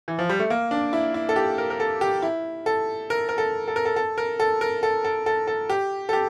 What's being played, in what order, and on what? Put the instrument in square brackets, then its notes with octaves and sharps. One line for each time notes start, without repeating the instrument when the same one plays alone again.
[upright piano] E3
F3
G3
A3
A#3
D4
E4
E4
A4
G4
A#4
A#4
A4
G4
E4
A4
A#4
A#4
A4
A4
A#4
A4
A4
A#4
A4
A#4
A4
A4
A4
A4
G4
A4
G4